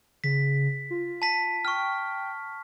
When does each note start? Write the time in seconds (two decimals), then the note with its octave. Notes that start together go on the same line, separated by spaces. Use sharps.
0.24 C#3 B6
0.90 F4
1.22 A5 B6
1.65 G5 C#6 F6